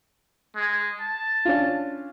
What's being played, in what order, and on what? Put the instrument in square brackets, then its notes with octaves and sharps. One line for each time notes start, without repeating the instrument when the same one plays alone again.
[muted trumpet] G#3
A5
[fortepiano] C#4 D4 F4